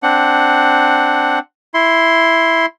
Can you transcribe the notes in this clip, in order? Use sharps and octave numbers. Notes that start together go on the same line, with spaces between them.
C4 D4 F#5
E4 C6